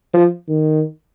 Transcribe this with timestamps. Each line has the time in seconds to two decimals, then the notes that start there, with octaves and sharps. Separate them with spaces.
0.14 F3
0.49 D#3